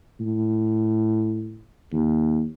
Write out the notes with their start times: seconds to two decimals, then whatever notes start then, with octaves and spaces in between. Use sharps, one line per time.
0.20 A2
1.92 D#2